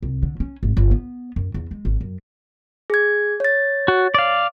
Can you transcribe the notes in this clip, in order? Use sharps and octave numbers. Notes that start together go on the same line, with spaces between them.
C2
D3
C#4
G#1
G1
B3
F#2
E2
G#3
G#1
F#2
G#4 G#6
C#5 A6
F#4
D5 F5